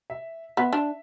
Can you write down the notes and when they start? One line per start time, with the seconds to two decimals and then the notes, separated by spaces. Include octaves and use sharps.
0.10 E5
0.57 B3 E5
0.73 D4